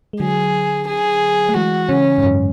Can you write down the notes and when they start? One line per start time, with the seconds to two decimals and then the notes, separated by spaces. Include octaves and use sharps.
0.13 G#3
0.20 D3 F#3 G#4
0.87 G#4
1.49 A3
1.55 E3 G#3 F#4
1.88 C#3 E3 C#4
2.18 G#2
2.23 F#2